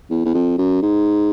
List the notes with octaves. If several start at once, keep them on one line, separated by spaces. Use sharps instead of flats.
E2
E2
F2
F#2
G#2